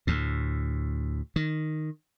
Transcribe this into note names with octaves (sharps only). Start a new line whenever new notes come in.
D2 A2
D#3